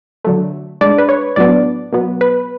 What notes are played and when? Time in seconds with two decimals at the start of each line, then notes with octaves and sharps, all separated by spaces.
0.24 D3 F#3 A3
0.81 A2 G#3 D4 D5
0.98 B4
1.09 C#5
1.36 A2 F#3 B3 D4 D5
1.93 B2 F#3 B3
2.21 B4